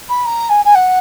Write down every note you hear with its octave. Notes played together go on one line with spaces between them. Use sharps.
B5
A#5
G#5
G#5
F#5